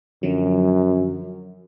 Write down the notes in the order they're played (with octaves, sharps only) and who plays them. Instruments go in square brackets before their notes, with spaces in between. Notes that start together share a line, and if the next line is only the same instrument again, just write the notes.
[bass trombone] F#2 [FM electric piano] D3 F3 F#3